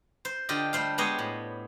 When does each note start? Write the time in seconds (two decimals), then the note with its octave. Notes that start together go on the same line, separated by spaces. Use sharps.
0.25 C5
0.49 D3 F4 G4 D#5
0.73 G3 A3 C5 F5
0.98 G#3 B3 G4 C5 C#5 D#5
1.19 A2